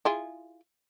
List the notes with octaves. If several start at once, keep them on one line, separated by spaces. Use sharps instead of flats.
E4 F4 G#4